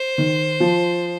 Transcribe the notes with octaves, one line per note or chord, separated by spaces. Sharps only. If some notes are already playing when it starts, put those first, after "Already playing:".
Already playing: C5
D#3
F3